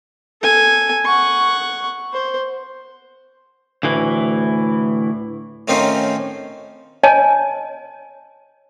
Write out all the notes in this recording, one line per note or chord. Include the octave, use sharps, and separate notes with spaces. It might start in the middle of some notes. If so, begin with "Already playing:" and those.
A4 G#5
F#5 C#6
C5
D2 A2 E3
A2 D#3 C4 C#4 D#4 F4
C#5 D#5 G#5 A5